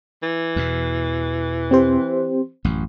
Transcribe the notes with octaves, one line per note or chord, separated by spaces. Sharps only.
E3
E2 B2
C4 G4 C5
A1 F#2